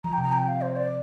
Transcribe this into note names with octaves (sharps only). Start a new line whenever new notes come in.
F3 A#5
C3 G5
A#5
G5
F5
C5
D5